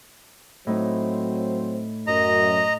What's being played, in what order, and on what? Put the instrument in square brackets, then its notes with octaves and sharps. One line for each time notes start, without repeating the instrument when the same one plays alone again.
[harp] A2 D#4 [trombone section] F#3 C4 C5
[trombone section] F#2 [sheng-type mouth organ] D#5 A#5